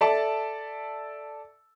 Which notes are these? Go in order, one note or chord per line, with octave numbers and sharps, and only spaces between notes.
A4 D5 E5 A5